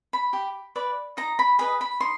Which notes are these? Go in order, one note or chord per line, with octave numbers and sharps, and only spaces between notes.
B5
G4
B4 D5
D#4 A#5
B5
G#4 B4 D#5 B5
B5
D#4 C6